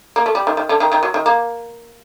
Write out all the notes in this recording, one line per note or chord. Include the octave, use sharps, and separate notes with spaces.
A#3
A3
G3
D#3
D#3
D3
D#3
D#3
F#3
D#3
A#3